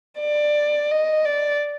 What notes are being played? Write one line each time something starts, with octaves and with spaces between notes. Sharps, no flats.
D5
D#5
D5